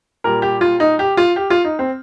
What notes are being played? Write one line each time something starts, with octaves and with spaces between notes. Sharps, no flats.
A#2 G3 A#4
G4
F4
D#4
G4
F4
G4
F4
D#4
C4